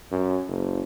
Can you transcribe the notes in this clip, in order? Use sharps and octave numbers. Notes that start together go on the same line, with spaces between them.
F#2
F#1